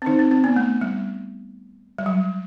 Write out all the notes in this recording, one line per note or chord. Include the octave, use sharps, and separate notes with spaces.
C4
D#3 D#4
C4
C4
B3
A3
G3
G3
F#3